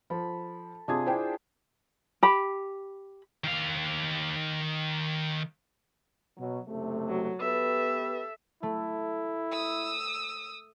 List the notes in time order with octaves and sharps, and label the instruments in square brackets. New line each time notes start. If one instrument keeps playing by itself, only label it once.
[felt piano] F3 [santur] A4 B5
[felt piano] C3 D#6 G#6 [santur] D4 F4 G#4
[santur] D4 [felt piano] E4 C5 G5
[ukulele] G4 B5
[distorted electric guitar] D#3 F5
[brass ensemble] B2 F#3
F#1 C3 A3
[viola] F#3
[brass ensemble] B3 G4 B4 [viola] A4 E5
[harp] A3 [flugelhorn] E4
[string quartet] D#6 E6